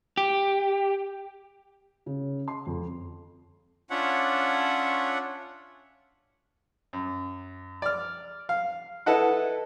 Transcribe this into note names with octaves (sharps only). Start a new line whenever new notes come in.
G4
C#3
C6
F2
C#4 D4 F4 C#5 E5 F#5
F#2
D5 F6
F5
E4 A4 B4 D#5 F#5